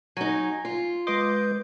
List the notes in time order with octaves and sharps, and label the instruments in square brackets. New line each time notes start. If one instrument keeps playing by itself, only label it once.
[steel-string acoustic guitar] F#3 D#4 [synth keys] G#5
[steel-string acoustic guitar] F4
[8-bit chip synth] G#3 B4 G6 [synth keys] D#5 C6 D6